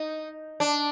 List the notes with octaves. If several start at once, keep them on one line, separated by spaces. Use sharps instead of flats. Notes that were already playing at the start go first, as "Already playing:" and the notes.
Already playing: D#4
D4